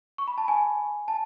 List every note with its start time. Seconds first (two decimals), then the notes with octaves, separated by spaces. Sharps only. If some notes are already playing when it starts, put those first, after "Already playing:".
0.18 C#6
0.28 B5
0.38 A5
0.48 G#5
1.08 A5